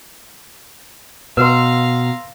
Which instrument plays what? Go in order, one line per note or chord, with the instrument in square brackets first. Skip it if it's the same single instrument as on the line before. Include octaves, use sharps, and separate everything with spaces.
[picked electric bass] B2 [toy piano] B4 [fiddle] F5 A#5 [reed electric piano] C6 E6